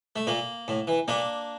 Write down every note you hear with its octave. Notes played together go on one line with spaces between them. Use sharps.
A3
A#2 A#3
A2
E3
A#2 A#3 D4